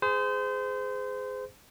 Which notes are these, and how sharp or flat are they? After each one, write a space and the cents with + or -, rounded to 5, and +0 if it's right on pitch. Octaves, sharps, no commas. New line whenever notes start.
G#4 +0 C5 -30